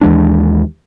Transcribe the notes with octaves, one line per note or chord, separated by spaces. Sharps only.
D#2 E3 G#3 D4